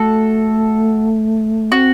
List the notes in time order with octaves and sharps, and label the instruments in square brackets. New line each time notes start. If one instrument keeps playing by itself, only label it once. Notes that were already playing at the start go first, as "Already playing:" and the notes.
Already playing: [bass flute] A3 [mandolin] F#4 A4
[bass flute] C4 [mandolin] F#4